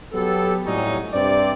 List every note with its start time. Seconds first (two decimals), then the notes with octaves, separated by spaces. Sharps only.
0.13 F#3 B3 G4 A4
0.66 A2 C3 F#3 G3 C#4 D#4
1.13 G2 C3 C4 D5